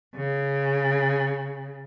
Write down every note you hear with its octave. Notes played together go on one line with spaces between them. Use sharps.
C#3